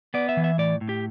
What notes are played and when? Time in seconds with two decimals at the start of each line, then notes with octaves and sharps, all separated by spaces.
0.14 B3 D5
0.29 E5
0.37 E3
0.44 E5
0.58 A2 D5
0.81 A2
0.89 G4